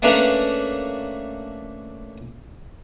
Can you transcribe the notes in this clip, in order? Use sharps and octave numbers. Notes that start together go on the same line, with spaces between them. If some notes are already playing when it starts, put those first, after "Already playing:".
A3 A#3 C#4 D4 B4 F5